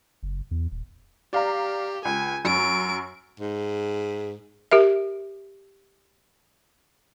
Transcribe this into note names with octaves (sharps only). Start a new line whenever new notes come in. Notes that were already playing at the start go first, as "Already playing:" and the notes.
F#1
E2
D#1
G4 D5 F5 A#5
C#2 G#5
F#2 C#6 D7
G#2
G4 A#4 E5